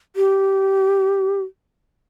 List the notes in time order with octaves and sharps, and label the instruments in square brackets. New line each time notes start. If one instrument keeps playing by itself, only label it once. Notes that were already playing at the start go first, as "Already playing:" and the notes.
[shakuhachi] G4